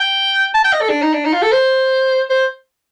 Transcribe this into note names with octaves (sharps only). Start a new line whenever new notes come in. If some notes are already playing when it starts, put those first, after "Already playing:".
Already playing: G5
A5
G5
D#5
A4
D4
D#4
D4
D#4
F4
A4
C5
C5